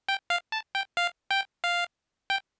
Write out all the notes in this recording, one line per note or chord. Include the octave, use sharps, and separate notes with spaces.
G5
F5
A5
G5
F5
G5
F5
G5